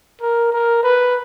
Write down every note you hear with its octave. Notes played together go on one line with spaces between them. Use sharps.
A#4
A#4
B4